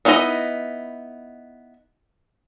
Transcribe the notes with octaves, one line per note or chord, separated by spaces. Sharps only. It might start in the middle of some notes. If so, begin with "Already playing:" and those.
B3 D#4 E4 A#4 D#5